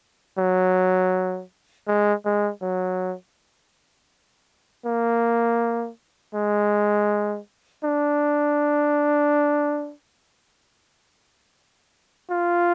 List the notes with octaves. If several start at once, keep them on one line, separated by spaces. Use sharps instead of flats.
F#3
G#3
G#3
F#3
A#3
G#3
D4
F4